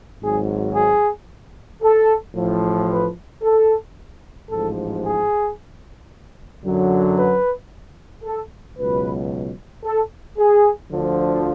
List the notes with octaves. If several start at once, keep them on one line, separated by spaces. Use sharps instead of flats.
G#1 G#2 F#3 G#4
G#4
A4
A1 A2 F3
B4
A4
A1 G#2 F3 A4
G#4
F#2 D3 F#3
B4
A4
C#2 B2 F#3 B4
A4
G#4
D2 D3 F3